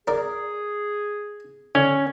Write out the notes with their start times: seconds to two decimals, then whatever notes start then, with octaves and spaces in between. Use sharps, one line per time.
0.08 G#4 A#4 D5
1.75 D3 C#4